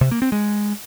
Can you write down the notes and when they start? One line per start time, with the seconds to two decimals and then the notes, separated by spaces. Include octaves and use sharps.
0.01 C3
0.11 A#3
0.22 C4
0.32 G#3